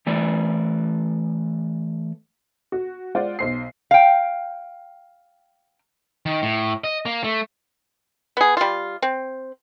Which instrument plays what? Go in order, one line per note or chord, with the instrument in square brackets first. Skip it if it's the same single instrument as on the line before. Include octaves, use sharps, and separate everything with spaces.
[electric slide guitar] E3 A3 D5
[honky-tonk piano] F#4
G#3 F4 C5 D5 F#5
B1 C5 C7
[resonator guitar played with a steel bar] F5 G5
[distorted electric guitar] D#3
A2
D#5
A#3
A3
[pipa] B3 G#4
G3 F4
C4